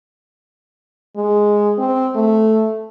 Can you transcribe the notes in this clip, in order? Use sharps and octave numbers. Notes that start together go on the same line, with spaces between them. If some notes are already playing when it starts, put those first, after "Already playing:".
G#3
C4
A3